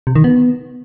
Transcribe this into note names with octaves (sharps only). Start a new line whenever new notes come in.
C3
D#3
B3